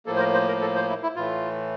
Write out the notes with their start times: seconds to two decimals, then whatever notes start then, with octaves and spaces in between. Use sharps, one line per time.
0.06 A2 F3 A#3 A4
0.16 C5
0.20 A#4
0.34 C5
0.48 A#4
0.61 A4
0.76 C5
0.89 E4
1.03 E4
1.16 A2 E3 A3 F4